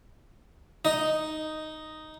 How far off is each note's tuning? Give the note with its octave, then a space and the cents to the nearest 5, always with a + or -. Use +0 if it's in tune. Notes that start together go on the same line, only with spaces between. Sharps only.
D#4 +0 D#5 +0